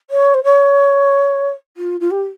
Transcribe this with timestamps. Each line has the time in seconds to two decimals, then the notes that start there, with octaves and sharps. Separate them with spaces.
0.10 C#5
0.34 C5
0.44 C#5
1.77 F4
2.00 F4
2.10 G4